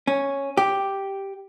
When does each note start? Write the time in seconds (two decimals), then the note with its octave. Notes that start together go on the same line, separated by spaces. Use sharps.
0.07 C#4
0.57 G4